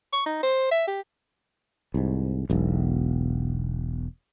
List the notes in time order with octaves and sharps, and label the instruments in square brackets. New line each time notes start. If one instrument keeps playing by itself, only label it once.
[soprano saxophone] C#6
D#4
C5
E5
G4
[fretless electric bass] C2 G#2
E1 B1